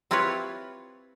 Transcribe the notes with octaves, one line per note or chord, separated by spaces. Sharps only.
C4 E4 F4 G4 B4 C#5